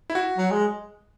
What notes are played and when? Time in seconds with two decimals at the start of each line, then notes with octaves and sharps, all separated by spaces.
0.10 E4
0.15 F#4
0.38 F#3
0.51 G#3